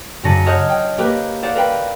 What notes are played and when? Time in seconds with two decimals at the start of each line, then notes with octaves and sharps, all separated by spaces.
0.23 F#2 C#3 D4 A#6 C#7 D#7
0.46 C5 C#5 D#5 F#5 F6 G6
0.69 G5
0.98 A#3 G4 A#4 B4
1.43 C5 D5 F5 F#5
1.55 A#4 B4 G5